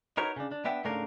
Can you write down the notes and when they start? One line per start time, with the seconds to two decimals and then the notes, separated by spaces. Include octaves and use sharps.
0.17 D#4 F#4 A#4 B4 C#5
0.36 C#3 D4
0.52 D4
0.65 B3 D4 E5 G5
0.84 G#2 C#3 A3 D4 A#4 F5